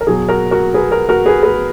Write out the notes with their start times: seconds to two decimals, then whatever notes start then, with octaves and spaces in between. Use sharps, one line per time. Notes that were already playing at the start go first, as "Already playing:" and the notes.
0.01 A#4
0.06 B2 F#3 G#4
0.29 F#4 A#4
0.51 F#4 A#4
0.74 G#4 B4
0.92 F#4 A#4
1.09 F#4 A#4
1.26 G#4 B4
1.43 G#4 B4